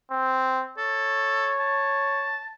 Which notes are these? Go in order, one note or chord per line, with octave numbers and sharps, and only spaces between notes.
C4
A4 C#5
A5